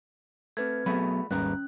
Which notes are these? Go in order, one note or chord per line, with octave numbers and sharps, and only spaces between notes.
A3 C4 B4 G#6
F#3 A3 B3 F#4 G#4 B4 B5
G#1 D#2 G3 C#4 B4 A#5 F#6